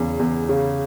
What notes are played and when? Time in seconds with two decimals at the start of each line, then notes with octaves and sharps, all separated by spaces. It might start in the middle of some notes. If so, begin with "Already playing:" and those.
Already playing: E2 C#3
0.19 E2
0.49 C#3